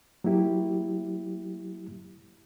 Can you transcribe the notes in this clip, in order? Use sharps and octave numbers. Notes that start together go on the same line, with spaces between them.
F#3 A#3 E4 G4